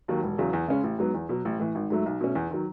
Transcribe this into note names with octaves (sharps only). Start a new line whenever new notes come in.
D#2 D#3 F#3
E1
E2 C#3 F#3
E2
C#3 G#3 C#4
A1
G#2 F#3 B3
E2
B2 F#3
A1
A2 E3
G#1
G#2 F#3 A3
B1
B2 A3 C#4
E2
D#3 F#3